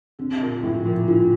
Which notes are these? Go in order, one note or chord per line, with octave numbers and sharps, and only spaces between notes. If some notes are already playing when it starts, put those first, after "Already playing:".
D3 C4
A#2
A2 F3
A#2
D3 F4